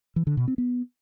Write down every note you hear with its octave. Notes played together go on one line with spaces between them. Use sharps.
E3
D3
B2
C4
B3